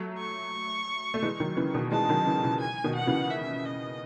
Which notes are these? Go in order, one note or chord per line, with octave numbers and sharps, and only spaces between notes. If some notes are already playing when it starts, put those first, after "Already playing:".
Already playing: F#3 A3
C#6
A3
E3 G#3
D#3 F#3
C#3 E3
B2 D#3
E3 G#3 A5
D#3 F#3
C#3 E3
C#3 E3
G#5
B2 D#3
F#5
C#3 E3
E5
D#5